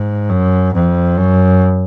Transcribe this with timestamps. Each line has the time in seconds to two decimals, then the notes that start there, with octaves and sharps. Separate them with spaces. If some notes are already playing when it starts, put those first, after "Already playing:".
Already playing: G#2
0.30 F#2
0.74 F2
1.17 F#2